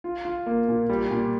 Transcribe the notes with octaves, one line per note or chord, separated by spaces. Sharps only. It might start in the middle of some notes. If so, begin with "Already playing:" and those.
F4
F4
A#3
A#2
G3
A#2